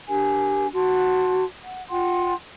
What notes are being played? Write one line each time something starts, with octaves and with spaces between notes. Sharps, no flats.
D4 G4 A#4 G#5
F#4 A5 C6
F#5
F4 F#5 G5 C6